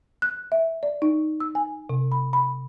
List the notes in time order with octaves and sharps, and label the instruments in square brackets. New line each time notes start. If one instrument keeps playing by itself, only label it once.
[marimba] F#6
E5
D5
D#4
E6
G#5
C3
B5
B5